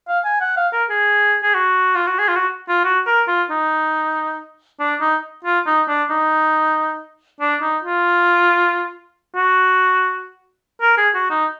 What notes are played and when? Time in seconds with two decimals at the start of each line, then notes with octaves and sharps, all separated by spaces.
0.08 F5
0.24 G#5
0.40 F#5
0.56 F5
0.73 A#4
0.90 G#4
1.43 G#4
1.54 F#4
1.95 F4
2.07 F#4
2.19 G#4
2.28 F4
2.35 F#4
2.69 F4
2.84 F#4
3.06 A#4
3.28 F4
3.50 D#4
4.80 D4
5.01 D#4
5.45 F4
5.66 D#4
5.88 D4
6.10 D#4
7.40 D4
7.62 D#4
7.83 F4
9.35 F#4
10.81 A#4
10.97 G#4
11.14 F#4
11.30 D#4